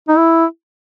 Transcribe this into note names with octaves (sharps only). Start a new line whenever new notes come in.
D#4
E4